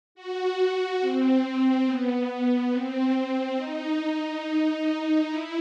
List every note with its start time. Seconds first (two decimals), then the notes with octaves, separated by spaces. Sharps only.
0.15 F#4
1.01 C4
1.85 B3
2.71 C4
3.56 D#4
5.27 E4